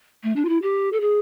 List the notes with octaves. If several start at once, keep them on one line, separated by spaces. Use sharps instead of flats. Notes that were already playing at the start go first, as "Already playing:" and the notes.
A3
D4
F4
E4
G4
A4
G#4